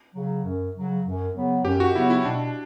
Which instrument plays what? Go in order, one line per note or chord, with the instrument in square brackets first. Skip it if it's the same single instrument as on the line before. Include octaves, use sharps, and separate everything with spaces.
[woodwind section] C#3 F#3
F#2
C#3 F#3
F#2
C#3 F#3 B3
[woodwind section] F#2 [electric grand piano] G4
[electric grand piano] F#4
[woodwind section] C#3 F#3 B3 [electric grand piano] E4
[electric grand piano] E4
[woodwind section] B2 [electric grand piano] D4